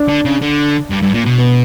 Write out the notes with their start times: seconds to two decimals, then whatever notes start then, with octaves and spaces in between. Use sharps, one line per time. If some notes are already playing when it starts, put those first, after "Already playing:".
Already playing: D4
0.09 D3
0.25 C#3
0.42 D3
0.90 G2
1.02 G2
1.14 A#2
1.26 B2
1.38 B3